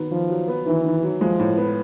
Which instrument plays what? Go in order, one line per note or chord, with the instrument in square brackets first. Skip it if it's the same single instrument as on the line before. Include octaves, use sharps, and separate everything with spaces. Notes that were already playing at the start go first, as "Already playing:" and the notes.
Already playing: [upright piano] D#3 F#3 B3
[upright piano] D#3 [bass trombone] F3
[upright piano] F#3
B3
[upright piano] D#3 [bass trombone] E3
[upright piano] D#3
F#3
[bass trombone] F3 [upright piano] G#3
[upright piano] A2
B3